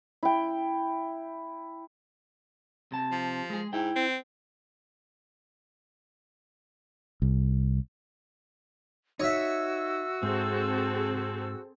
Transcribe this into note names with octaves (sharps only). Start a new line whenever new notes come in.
E4 G5
C3 A5
F3
G#3 G#4
G#2 E4 G5
C4
C2
D#4 F#4 C#5 E5 E6
G#2 C4 G#4 A4